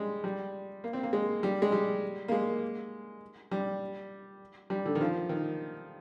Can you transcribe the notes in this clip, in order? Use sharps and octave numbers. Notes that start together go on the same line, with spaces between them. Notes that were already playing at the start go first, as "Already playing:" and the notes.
Already playing: G3 G#3
G3
A#3
C4
A#3
G#3
G3
G#3
G3
A#3
G#3
G3
G3
D3
D#3
F3
D#3